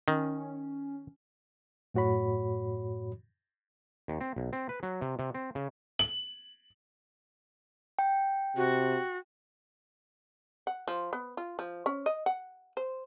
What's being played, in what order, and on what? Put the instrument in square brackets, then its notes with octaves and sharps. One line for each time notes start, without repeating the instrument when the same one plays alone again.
[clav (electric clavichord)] D#3 [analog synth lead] C#4
[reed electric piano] F#2 A2 F#4 C#5 B5
[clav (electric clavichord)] D#2
C4
B1
C4
B4
F#3
C3
C3
C4
C#3
[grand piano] F#7
[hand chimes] G5
[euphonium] C3 [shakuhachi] F#4
[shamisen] F#5
F3
B3
F4
F3
C#4
D#5
F#5
C5